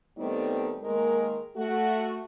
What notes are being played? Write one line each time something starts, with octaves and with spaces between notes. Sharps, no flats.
D#3 G3 A3 B3 C4 D#4
D#3 G#3 A#3 A#4
A3 F#4